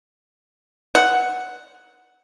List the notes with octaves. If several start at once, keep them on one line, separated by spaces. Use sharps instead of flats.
F#5